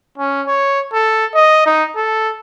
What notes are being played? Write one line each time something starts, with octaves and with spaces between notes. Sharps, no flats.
C#4
C#5
A4
D#5
D#4
A4